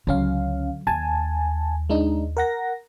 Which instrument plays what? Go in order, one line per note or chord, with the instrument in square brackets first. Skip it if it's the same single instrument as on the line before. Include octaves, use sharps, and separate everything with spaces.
[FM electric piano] C#2 C#4 F5 [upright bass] D3 F#3
[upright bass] D#2 [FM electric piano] G#5 A5
[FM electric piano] G#3 D4 D#4
A#4 F#5 A#6